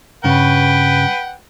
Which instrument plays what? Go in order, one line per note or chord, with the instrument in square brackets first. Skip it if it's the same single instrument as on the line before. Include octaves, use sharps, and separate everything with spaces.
[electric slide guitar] G2 C#3 [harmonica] B4 F#5 G5